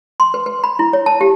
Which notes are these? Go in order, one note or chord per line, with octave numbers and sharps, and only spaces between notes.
C6
B4
B4
B5
E4
C#5
A5
G4